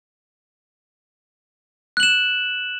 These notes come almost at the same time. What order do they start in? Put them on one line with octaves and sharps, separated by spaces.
F#6 F#7 E7